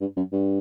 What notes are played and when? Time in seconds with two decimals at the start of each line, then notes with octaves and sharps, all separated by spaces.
0.01 G2
0.17 F#2
0.32 G2